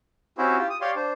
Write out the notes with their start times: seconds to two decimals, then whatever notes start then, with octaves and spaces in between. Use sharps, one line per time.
0.38 C4 C#4 E4 F#4 G4 C5
0.58 F4 G4
0.70 D#6
0.81 G4 C#5 D5 F5 C6
0.96 D4 C5